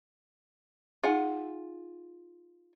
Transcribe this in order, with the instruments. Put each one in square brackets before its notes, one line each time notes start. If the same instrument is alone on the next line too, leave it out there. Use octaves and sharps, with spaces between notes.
[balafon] D#4 G#4 [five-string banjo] F4 F#5 G#5